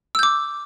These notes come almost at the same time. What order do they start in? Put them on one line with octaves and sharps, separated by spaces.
E6 G6 D6